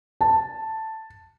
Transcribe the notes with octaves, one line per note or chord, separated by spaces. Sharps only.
A5